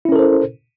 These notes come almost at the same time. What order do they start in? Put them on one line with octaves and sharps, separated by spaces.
E4 C#4 A#4 A4 C5